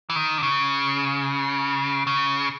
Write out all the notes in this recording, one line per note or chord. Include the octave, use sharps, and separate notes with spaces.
E3
D#3
D3
C#3
C#3